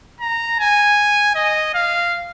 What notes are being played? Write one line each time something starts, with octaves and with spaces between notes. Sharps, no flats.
A#5
G#5
D#5
F5